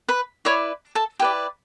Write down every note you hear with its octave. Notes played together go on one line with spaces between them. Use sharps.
B4 B5
E4 B4 C#5 D5 C#6
A4 A5
E4 G4 B4 D5 G5